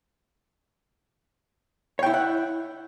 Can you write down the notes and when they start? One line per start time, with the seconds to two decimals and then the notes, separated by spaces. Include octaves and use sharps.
1.99 C#5
2.03 G5
2.06 E4
2.10 E5
2.14 F#5